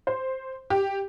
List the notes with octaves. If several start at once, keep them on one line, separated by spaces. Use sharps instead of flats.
C5
G4